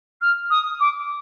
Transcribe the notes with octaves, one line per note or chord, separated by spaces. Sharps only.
F6
D#6
D6